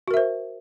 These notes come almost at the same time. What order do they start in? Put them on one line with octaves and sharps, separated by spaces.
F#4 A#4 E5 C5